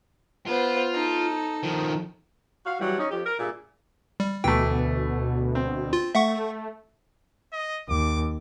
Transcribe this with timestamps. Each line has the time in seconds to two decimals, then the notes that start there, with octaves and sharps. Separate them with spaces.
0.47 B3 F4 C5
0.94 D#4 A4
1.64 D#3 F3
2.65 F#4 F5
2.80 E3 F#3 G3
2.98 C#4 D#4
3.10 F2 G4
3.25 A#4
3.39 G2 A#2 A#3 G#4 E5
4.20 G3
4.44 D2 B2 E3 A3 G5
5.55 C4
5.93 F4
6.15 A3 E5 F#5 C#6
7.53 D#5
7.89 D#2 D6